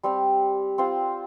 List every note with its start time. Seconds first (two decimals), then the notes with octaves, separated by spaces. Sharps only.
0.03 G3 C4 G4
0.78 C4 F4 C5